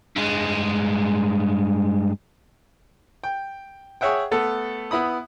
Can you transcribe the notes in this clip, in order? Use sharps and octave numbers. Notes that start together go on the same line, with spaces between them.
G2 G#3
G5
G#4 C#5 E5 F#5 G5
A3 B3 A4
B3 E4 B5 D#6